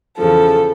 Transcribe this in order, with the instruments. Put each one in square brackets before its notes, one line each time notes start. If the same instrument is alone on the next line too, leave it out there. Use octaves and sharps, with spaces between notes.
[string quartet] E2 C#3 F3 A4